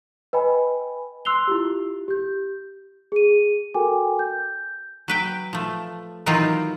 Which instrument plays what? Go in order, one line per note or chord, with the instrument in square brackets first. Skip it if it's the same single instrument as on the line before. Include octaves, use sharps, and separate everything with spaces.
[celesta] B4 D#5 G5 G#5 B5
C6 E6 F#6 C7 F7 G7
E4 F4 G4
G4 G6
G#4 D#7
F#4 A4 A#4 G5 G#5 D6
G6
[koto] F#3 B4 G5
F3 A3
D#3 E3 F#3 C4 D#4 F4